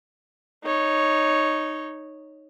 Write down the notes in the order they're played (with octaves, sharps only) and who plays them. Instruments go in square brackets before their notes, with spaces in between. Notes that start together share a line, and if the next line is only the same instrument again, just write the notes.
[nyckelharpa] D#4 C#5